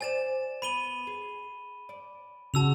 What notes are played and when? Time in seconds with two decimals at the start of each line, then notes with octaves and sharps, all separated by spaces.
0.01 C5 D5 G#5 A6 E7
0.62 B3 B5 D#7 G7
1.07 G#4
1.89 D5
2.54 C#3 F#4 A5 E6 F7